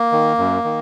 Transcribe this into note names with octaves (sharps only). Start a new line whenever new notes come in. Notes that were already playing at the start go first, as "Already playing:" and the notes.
Already playing: A#3
D#3
F#2
D#3